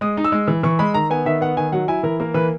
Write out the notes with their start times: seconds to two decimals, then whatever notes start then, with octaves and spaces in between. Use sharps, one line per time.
0.01 G#3 D#6
0.17 D#4
0.24 E6
0.32 G#3
0.48 E3
0.63 E3 C#6
0.79 G#3 B5
0.94 D#3 A#5
1.10 B3 G#5
1.25 D#3 E5
1.41 B3 F#5
1.57 D#3 G#5
1.72 F#3 F#5
1.88 E4 G#5
2.03 E3 A#4
2.20 A#3 A#4
2.34 E3 B4